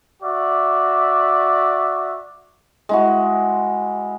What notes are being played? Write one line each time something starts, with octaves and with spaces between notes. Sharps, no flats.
F#4 D5 E5
G#3 E4 F#4